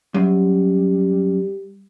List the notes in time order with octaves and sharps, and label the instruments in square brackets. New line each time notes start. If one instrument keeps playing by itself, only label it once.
[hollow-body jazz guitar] F#2 [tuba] G3